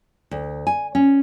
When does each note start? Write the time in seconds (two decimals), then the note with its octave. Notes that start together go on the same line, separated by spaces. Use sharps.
0.31 D2
0.67 G#5
0.95 C#4